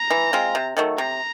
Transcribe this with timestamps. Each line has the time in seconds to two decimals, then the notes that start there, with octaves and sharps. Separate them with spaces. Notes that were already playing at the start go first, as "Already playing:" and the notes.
Already playing: A#5
0.10 E3
0.33 G#3 C4 F4
0.55 C3
0.77 D#3 F#3 A3
0.98 C3 A#5